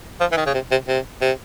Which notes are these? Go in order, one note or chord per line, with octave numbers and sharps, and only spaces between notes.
F3
E3
D#3
C#3
C3
C3
C3
C3